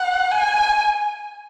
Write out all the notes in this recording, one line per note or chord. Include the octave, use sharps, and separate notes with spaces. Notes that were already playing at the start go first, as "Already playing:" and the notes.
Already playing: F#5
G#5